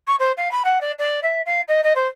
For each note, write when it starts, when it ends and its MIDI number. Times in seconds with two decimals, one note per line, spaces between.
0.07 0.16 85
0.19 0.32 72
0.37 0.51 77
0.51 0.63 83
0.65 0.79 78
0.81 0.92 74
0.99 1.20 74
1.23 1.41 76
1.46 1.61 77
1.68 1.81 75
1.83 1.93 75
1.95 2.07 72